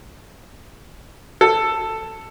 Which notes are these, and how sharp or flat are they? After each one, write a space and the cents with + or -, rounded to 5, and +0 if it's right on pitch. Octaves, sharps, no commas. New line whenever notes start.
A4 +10